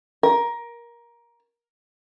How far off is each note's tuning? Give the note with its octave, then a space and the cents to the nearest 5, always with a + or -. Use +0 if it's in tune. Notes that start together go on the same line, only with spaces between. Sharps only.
A#4 +15